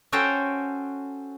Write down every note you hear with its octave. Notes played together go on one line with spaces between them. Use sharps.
C#4 F#4 A4 C5 C#5 G5